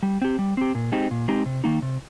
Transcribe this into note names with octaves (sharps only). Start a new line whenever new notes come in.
G3
C4 G4
G3
C4 G4
A#2
G#3 C4 D#4 G4
A#2
G#3 C4 D#4 G4
C3
D#3 A#3 D#4
C3